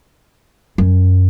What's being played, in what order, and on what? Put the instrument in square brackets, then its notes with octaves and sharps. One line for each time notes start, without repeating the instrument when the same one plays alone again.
[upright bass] F#2